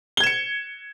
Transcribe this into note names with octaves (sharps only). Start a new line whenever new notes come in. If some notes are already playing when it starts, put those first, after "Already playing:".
G#6 C#7 E7 G7